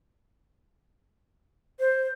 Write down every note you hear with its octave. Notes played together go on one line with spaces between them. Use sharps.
C5